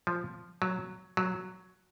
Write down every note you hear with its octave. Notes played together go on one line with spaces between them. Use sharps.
F3
F#3
F#3